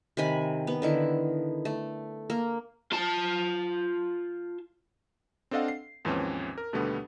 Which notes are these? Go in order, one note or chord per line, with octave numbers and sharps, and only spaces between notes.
C3 D#3 G#5 B5
B3
D3 D#3 E4
A3
A#3
F4 A5
C4 D4 A4 D#5 F5 F#5
C7
D#2 G#2 E3 F3 C4 C#4
A#4
D#2 B2 D3 G3 A3 B3